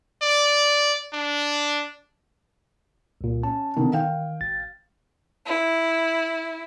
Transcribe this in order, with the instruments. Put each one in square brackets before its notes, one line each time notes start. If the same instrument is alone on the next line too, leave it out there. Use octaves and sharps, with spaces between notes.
[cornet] D5
D4
[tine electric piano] C2 A#2
[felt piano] C#4 [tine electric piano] A5
[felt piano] B2 D3 D#3
[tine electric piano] D#3 [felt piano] F5 G5
[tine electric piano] G#1 A6
[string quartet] E4